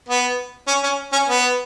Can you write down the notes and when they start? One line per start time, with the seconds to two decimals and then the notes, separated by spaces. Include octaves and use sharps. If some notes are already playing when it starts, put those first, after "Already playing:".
0.09 B3
0.68 C#4
0.84 C#4
1.13 C#4
1.29 B3